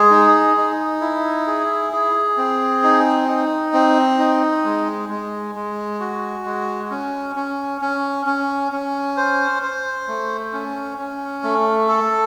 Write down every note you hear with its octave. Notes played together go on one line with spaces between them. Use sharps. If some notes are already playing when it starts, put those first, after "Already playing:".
Already playing: G#3 G#4
D#4
D#4
E4
G#4
G#4
C4
D#4
D#4
C4
D#4
G#3
G#3
G#3
F#4
G#3
C#4
C#4
C#4
C#4
C#4
C5
C5
A3
C#4
C#4
A3
A4